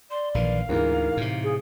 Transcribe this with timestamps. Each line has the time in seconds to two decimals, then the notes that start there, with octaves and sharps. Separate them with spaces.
0.11 D5 C6
0.34 A#1 D#3 E3 F5
0.69 D2 G#2 E3 A#4
1.17 A2 C3
1.43 G#4